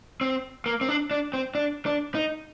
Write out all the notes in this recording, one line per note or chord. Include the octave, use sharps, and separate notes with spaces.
C4
A#3
C4
D4
D4
C4
D4
D4
D#4